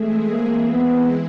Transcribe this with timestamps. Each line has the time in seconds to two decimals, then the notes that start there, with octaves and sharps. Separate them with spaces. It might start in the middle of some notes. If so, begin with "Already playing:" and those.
Already playing: E3 G#3 A3 C4 E4 G#4
0.30 A#3
0.72 B3